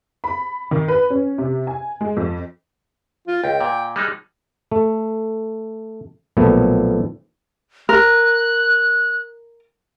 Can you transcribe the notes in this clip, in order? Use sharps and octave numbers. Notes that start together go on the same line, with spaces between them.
B5
D#3
B4
C#4
C3
G#5
G#3
F2
F4
C#2 G5
A#2
G3 G#3 D#4
A3
B1 A#2 F3 A3 B3
A#4 F#6